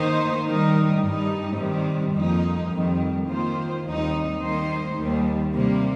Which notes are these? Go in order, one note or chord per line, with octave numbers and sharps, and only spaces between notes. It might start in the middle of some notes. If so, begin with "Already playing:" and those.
Already playing: D#3 A#3 D#4 C5
D#3 G3 D#4 A#4
G2 G3 D#4
C3 D#3 G3
F2 F3 A#3 D#4
F2 D#3 G3
D#3 A#3 F4 C5
D#2 D#3 G3 C4 D#4
D#3 G3 A#3 D#4 C5
D#2 D#3 G3
C3 G3 A#3